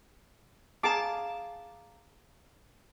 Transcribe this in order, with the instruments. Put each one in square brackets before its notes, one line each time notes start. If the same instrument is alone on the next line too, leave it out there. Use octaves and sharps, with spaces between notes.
[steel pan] G#4 A5 D6 [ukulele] F5 A#5